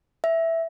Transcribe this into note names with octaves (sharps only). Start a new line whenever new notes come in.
E5